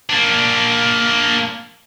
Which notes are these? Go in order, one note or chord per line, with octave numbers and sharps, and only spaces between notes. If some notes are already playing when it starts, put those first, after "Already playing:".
A#3 D4